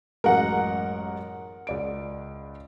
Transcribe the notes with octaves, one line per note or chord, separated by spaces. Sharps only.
A1 F#2 G#3 A#4 F#5
C#2 D5 D7